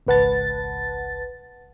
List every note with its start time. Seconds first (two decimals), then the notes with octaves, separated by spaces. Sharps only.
0.07 G#1 C#2 B4 F#5 A5 A6